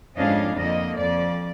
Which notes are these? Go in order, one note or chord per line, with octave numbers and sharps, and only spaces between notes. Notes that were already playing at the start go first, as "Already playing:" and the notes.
F2 G#2 C#4 D4 D#5 F5
F2 D3 A#3 D#5
F2 D5